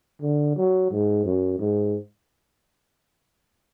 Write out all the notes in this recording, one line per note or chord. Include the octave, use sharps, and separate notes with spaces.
D3
F#3
G#2
F#2
G#2